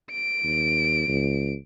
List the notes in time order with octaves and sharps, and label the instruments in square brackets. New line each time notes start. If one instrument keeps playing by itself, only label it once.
[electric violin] D7
[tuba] D#2
C#2